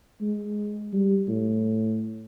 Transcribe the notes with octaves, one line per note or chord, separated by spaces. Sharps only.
G#3
G3
A2